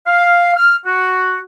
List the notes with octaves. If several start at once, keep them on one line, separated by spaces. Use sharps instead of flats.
F5
F6
F#4